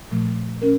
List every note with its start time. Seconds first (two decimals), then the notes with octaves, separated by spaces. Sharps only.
0.11 A#2 F3 A3
0.62 C#4 A#4